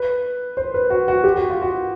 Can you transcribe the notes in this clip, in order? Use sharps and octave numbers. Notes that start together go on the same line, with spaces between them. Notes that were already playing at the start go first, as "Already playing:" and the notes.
Already playing: B4
C5
B4
F#4
F#4
G4
F#4
F4
F#4